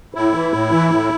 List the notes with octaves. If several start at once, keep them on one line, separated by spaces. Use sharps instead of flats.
A2 E4
E3
A2
E3
A2